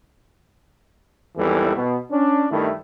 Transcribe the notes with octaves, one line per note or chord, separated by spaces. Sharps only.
G#1 E2 E3 G3 A4
B2
C#4 D4
G2 D#3 A3 E4